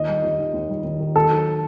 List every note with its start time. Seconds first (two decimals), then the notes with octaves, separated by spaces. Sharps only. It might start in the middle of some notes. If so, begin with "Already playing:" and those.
Already playing: D#2 D#5
0.08 G3
0.23 D#2
0.39 D#3
0.54 D#2
0.69 G3
0.84 D#2
1.00 D#3
1.16 D#2 A4
1.31 F#3